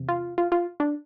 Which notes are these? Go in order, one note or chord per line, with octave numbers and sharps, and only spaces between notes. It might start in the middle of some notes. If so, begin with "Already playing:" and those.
Already playing: E2 C3
F4
F4
F4
D4